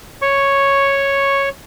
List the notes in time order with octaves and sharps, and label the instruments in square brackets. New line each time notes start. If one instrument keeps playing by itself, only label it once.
[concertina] C#5 C#6